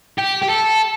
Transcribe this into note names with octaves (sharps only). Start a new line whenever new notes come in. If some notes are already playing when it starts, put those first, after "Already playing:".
G4
G4
A4